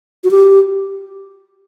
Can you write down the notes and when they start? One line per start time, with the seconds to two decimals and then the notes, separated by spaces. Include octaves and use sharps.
0.24 F#4
0.31 G4